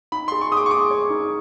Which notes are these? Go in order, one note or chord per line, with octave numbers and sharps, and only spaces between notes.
D#4 B5
C6
G#4
C#6
G#4 D6 D#6
C#6
G#4 D6
C#5
D#4